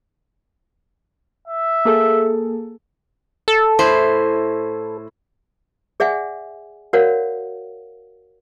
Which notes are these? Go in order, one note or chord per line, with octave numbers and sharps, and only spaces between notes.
E5
A#3 G#4 A4
A4
A2 E4 C5
G#4 D5 E5 F#5 G#5
F#4 A#4 C#5 D5 F5 F#5